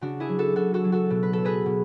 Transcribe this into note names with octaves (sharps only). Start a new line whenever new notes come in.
C#3 D4 F#4
E4 G#4
F#3
F#4 A4
C#3 F#4 A4
F#4 A4
F#3
F#4 A4
B2
B4
F#3 A4
G#4 B4
B2